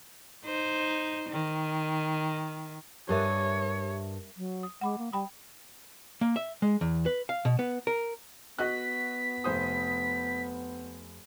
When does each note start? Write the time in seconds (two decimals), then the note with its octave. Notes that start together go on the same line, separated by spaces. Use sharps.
0.45 D#4 C5
1.29 D#3
3.09 G2 G4 A#4 C#5 E5
4.37 F#3
4.63 D#6
4.81 G#3 F#5 B5 D6
4.98 A#3
5.13 G3 G5 B5 D#6
6.21 A#3
6.36 E5
6.62 G#3
6.81 E2
7.06 B4
7.29 F5
7.45 B2
7.59 B3
7.87 A#4
8.58 B3 F#4 D#5 F#6 B6
9.44 F1 C5 D#6